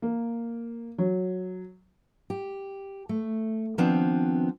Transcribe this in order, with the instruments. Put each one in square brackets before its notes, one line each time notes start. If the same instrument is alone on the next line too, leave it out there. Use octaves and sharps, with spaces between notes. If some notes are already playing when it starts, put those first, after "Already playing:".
[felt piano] A#3
F#3
[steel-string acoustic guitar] G4
A3
D#3 F3 B3 C4 D4